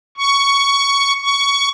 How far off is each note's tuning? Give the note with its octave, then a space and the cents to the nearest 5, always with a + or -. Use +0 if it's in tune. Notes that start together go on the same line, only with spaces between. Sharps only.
C#6 +10
C#6 +15